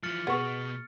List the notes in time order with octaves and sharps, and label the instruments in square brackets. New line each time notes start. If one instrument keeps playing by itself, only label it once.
[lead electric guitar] E3 F3 [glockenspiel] F6 A6 C#7
[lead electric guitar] B2 [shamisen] B3 [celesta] G#4 B4 C#6